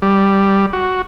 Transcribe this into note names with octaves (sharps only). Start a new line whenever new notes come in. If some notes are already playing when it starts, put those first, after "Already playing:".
G3
F#4